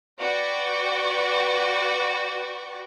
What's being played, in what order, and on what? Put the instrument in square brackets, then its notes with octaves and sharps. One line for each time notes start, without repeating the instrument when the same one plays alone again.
[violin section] F#4 B4 D5 F#5 G5 C#6